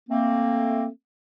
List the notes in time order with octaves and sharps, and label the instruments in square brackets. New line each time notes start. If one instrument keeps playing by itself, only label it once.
[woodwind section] A3 A#3 C4